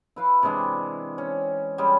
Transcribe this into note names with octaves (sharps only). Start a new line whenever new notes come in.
E4 B4 F5
C3 E3 G#3 D4
C#4
G3 G#3 C#4